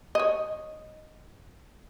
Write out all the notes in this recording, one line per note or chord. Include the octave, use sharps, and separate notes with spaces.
C#5 D#5